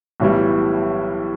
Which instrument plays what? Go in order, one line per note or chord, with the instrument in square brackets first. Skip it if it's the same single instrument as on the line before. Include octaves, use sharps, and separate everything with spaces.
[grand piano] B1 A2 E3 G3